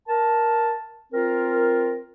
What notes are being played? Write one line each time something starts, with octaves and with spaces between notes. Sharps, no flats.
A#4 A5
C4 F4 A#4